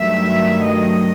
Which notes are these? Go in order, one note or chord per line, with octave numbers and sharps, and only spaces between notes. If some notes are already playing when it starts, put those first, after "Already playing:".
Already playing: G2 D#3 F#3 A3 E5
D#5